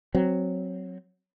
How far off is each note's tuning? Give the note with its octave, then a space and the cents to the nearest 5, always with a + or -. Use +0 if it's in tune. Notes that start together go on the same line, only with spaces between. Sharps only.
F#3 +0 C4 +0